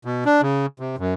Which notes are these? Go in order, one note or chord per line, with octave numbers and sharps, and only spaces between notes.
B2
D4
C#3
C3
F#2